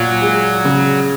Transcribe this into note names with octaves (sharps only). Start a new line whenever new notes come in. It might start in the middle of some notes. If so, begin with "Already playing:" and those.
Already playing: A#2 F#3
G#3
C#3